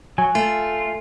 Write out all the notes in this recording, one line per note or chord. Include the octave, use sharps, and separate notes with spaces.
F#3 G#5
A3 F4